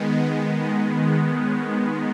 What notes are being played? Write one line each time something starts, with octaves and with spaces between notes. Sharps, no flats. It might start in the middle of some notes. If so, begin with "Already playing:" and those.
Already playing: D#3 G#3 B3
D#5
D#5
F#5
C#5